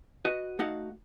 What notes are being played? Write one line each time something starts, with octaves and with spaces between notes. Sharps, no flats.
F#4 B4 D#5
A3 D#4 F#4 D#5 F5 F#5